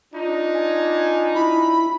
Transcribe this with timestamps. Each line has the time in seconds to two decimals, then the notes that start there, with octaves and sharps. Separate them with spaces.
0.14 D4 D#4 F4
0.55 G#5
1.35 E4 B5